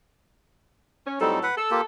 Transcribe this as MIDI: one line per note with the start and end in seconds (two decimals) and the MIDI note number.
1.07 1.19 61
1.21 1.45 45
1.21 1.45 54
1.21 1.39 55
1.21 1.39 60
1.21 1.39 63
1.21 1.45 69
1.43 1.55 71
1.43 1.55 78
1.57 1.84 69
1.57 1.70 88
1.71 1.81 58
1.71 1.81 65
1.71 1.81 67